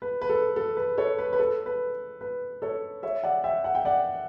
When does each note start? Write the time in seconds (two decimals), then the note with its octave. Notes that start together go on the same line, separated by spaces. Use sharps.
0.02 B4
0.22 B4
0.29 A4
0.56 A4
0.77 B4
0.98 A4 C#5
1.18 B4
1.33 B4
1.39 A4
1.66 B4
2.21 B4
2.62 A4 C#5
3.03 C#5 E5
3.24 D5 F#5
3.44 E5 G5
3.64 F#5
3.75 G5
3.85 D5 F#5